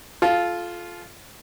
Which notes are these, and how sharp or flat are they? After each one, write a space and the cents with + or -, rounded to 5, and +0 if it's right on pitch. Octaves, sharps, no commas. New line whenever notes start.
F4 +0 A4 -30